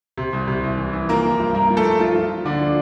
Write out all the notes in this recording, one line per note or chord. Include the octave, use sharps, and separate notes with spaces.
C3
C2
C3
C2
E3
E3
F3 A#3 A#4
F3
G2
G2 A#3 A#4
F3
A3 A4
G2
G2 F3 F4
F3
F3
D3 F3 D4
F3